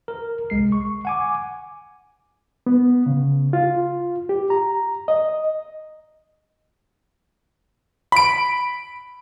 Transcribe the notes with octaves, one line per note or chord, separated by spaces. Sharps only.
A#4
C2 G#3 C7
C#6
F#5 G#5 D6
B3
C#3
F4
G4
A#5
D#5
B5 D7